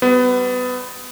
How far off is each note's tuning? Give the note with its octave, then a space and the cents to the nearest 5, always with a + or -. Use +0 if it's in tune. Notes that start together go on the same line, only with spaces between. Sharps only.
G3 -20 B3 +20